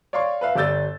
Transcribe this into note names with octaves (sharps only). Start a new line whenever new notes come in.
C#5 D5 F5 C6 C#6
B4 E5 F5
G1 G3 D5 E6 G6 A6